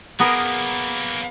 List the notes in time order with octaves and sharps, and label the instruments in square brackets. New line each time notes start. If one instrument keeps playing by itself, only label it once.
[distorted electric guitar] F#3 A#3 [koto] B3 G#4 A#4